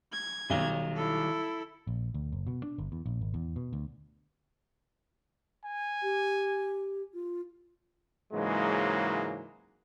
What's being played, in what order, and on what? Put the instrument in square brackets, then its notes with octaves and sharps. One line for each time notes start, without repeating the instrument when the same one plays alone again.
[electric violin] G#6
[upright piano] B1 G7 [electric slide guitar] D#3 F#3 G3
[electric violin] E4 A4
[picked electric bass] A#1
D2
F#1
B2
D4
G1
E2
A#1
G#1
E2
B2
D2
[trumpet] G#5
[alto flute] G4
F4
[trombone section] G#2 C#3 E3 F#3 G#3 A#3